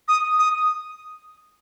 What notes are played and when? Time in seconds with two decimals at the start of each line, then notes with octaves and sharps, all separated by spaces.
0.08 D#6
0.39 D#6